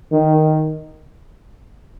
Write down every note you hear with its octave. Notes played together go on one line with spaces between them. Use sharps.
D#3